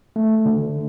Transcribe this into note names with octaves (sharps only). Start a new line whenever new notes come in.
A3
D3